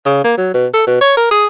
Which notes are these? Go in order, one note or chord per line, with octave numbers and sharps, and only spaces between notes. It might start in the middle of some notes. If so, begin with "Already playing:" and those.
C#3
A#3
F#3
B2
A4
B2
C#5
A#4
G#4